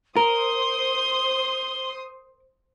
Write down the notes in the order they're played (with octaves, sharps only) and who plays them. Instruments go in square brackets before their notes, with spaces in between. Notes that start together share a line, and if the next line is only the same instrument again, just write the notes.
[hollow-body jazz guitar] A#4 [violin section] C5 C6 D#6 [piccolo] G7